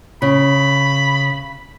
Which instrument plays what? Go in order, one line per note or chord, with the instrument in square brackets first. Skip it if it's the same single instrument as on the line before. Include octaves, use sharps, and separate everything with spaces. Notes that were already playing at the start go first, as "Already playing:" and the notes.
[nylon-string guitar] C#3 [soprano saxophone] B5